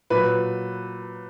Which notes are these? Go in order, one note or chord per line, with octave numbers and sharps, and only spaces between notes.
A#2 F#3 B4